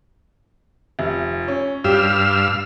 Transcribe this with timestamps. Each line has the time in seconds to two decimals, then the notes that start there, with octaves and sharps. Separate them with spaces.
0.99 F1
1.48 C#4
1.84 G2 G4 F5 E6